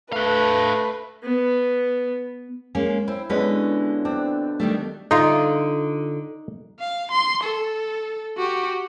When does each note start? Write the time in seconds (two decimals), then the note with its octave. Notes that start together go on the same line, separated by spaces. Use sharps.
0.12 A3 D4 B4 F5
1.23 B3
2.75 G#3 A#3 C#4
3.08 C4 E4
3.30 B2 D3 G#3 C#4 B4
4.05 C4 D4
4.60 D#3 G3 A3
5.11 D3 D#4 F4
6.79 F5
7.11 C6
7.43 A4
8.38 F#4 G4